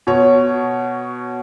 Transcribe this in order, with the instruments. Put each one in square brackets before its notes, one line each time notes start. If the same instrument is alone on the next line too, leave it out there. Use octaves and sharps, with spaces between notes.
[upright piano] B2 C#5